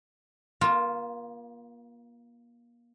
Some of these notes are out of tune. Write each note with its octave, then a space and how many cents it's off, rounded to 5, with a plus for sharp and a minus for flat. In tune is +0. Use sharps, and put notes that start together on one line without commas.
A#3 +35 F4 +0